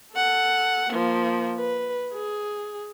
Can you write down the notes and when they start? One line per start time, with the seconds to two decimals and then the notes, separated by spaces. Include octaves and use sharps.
0.15 A4 F#5
0.89 F3 A#3
1.57 B4
2.14 G#4